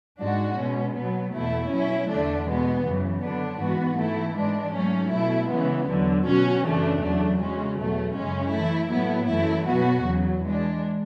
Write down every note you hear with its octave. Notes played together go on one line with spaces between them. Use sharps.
G#2 G#3 D4 F#4
B2 G#3 C#4
B2 F#3 B3
E2 B2 A3 E4
B2 F#3 C#4 E4
E2 D3 A3 D4
B2 G#3 B3
F#2 C#3 E3
D3 F#3 B3 D4
G#2 E3 B3 F#4
E3 A3 E4
G#2 E3 G#3 D4
G#2 F#3 A3 C#4
B2 A3 E4
C#3 E3 G#3 B3
E2 D3 F#3
B2 F#3 C#4 F#4
F#2 C#3 E3 A3 D4
E2 C#3 F#3 A3 D4
C#3 G#3 C#4 F#4
E2 B2 F#3 A3
F#2 C#3 G#3 C#4
E3 A3 E4
A2 F#3 B3 E4
F#2 E3 A3 E4
B2 F#3 B3 F#4
E2 C#3 F#3
E3 G#3 D4